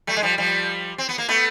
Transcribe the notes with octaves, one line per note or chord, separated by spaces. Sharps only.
G3 A3
G#3
F3 G3
F3 G3
C4
B3
A#3
A3 B3